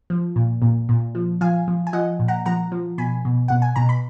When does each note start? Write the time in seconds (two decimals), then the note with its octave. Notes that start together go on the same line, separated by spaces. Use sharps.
0.10 F3
0.36 A#2
0.62 A#2
0.89 A#2
1.15 F3
1.41 F3 F5 G#5
1.68 F3
1.87 G#5
1.93 F3 D#5 F#5
2.19 A#2
2.28 F#5 A#5
2.46 F3 F#5 A#5
2.72 F3
2.98 B2 G#5 B5
3.25 B2
3.48 B2 F#5
3.62 G#5
3.76 B2 A#5
3.89 B5